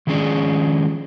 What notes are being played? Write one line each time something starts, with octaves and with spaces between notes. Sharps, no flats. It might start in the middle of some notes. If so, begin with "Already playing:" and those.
D#3 F3 G#3 C#4 G#4 D5